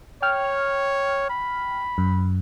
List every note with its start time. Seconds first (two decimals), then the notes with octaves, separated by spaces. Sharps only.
0.22 C#5 G5 F6
1.30 B5
1.98 F#2